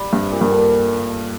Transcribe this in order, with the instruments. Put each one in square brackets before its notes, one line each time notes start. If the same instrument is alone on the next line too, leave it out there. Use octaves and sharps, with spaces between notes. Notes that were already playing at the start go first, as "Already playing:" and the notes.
Already playing: [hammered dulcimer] G3
[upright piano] G2 [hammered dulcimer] C3
[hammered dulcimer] A#2
[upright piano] G2
[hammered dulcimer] D3